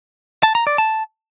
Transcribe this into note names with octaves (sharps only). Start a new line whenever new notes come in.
A5
A#5
D5
A5